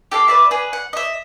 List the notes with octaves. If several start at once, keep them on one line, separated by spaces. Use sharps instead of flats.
G4 A4 F5
B4 D5 E5
G#4 B4
F#5
D#5 E5